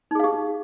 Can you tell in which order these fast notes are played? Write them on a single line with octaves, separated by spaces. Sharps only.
D#4 G#4 F5 G4